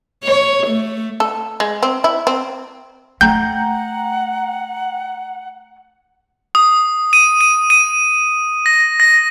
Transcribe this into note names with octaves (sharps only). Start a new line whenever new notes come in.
C#5
A3
A4
G#3
C4
E4
C4
A3 F#5 G5 A#5 G6
D#6
D#7
D#7
D#7
A#6
A#6